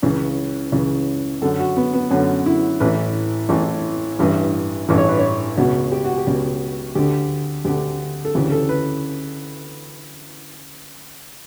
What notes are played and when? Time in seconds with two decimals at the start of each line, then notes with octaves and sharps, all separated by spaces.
0.03 C#2 C#3 E3
0.72 C#2 C#3 E3
1.42 F#2 D3 A4
1.59 F#4
1.77 B3
1.93 B3
2.10 F#2 D3 C#4
2.46 E4
2.80 A1 A2 E3 B4
3.49 A1 A2 E3
4.19 A1 G2 E3
4.88 A1 G2 E3
4.98 C#5
5.09 B4
5.19 C#5
5.57 C#2 B2 F#4
5.92 G4
6.04 F#4
6.17 G4
6.27 C#2 B2
6.95 D2 D3 G4
7.65 D2 D3 G4
8.25 A4
8.35 D2 C#3 E3 G4
8.52 A4
8.69 B4